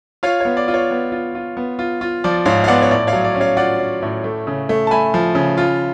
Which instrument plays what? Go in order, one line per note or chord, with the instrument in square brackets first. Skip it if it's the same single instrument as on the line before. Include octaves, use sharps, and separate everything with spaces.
[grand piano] F4 C#5 F5
B3 C#5
D5
F4
C#5
B3
F4
F4
B3
F4
F4
F3 D5
G#2 C#5 F5
F5
B3 D5 F#5
C#5
A2 D5
C#5 F5
F#3
D5
C#4
C#5 F5
F4 D5 F#5
C#4
A2
A3
C#3
A3
A5
A3 G#5 B5
F3
C#3
F4